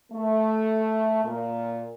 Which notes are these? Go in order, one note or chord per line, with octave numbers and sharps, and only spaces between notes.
A3
A#2